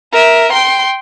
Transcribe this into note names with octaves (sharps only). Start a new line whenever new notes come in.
A#4 E5
G5 C6